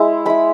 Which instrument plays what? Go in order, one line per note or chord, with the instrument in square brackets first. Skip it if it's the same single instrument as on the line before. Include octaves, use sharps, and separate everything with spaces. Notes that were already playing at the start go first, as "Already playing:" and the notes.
Already playing: [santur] G#3 E4
G#3 E4 B5